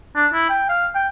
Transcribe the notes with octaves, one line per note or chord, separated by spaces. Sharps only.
D4
E4
G5
F5
G5